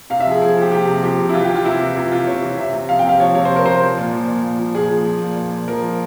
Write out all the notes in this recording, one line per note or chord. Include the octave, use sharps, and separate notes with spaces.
C3 F5
E5
F3 G#4
F3 G#4
F3 G4
C3 G4
C3
F3 G4
C3
E4
E3 F4
G4
E3
F4
C3 E4
E3
C3 F4
E3 F4
C3 C#5
E3
C3 E5
C3
F3 F5
C3 G5
F5
F3 C#5
C3 C#5
F3 C5
A#4
C3 C5
F3
A#2
F3
A#2
A#2
F3
A#2 G#4
F3
F3
A#2
A#2
A#2
F3 A#4
F3